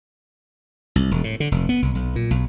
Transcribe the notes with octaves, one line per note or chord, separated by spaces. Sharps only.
C2
E1
A2
D3
F1
B3
C2
B1
A#2
B1